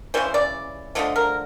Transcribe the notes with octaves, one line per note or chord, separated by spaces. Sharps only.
C#3 E3 G3 C5
D5
D3 F3 A3 D#5
A#4